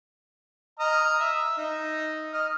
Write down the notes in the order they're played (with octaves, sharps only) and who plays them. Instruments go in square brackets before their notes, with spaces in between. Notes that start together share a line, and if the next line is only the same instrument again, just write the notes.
[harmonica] D#5 A#5 F6
E5
D#4
D#5 F6